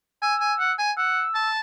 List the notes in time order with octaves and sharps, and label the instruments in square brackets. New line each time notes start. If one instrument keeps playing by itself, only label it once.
[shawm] G#5 [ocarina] E6
[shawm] G#5
F#5
G#5
[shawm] F#5 [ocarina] E6
[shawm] A5